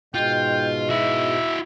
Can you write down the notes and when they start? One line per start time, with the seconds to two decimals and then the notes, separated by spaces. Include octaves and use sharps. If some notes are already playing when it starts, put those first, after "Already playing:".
0.15 G#2 B2 G#3 F4 G5
0.90 E4 F#4 E5